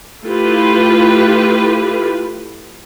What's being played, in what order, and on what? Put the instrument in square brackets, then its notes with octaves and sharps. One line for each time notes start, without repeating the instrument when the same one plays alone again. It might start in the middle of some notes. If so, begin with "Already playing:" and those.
[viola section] A3 E4 F4 G4 B4